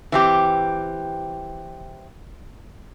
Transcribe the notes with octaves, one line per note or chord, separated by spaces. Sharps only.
E3 C4 G4